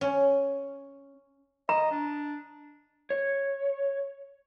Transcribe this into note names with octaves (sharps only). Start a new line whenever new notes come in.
C#4
D#5 A#5
D4
C#5